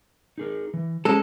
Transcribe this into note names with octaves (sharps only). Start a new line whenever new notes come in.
D#4 G#4 A#4
E3
G#3 C#4 A4 C5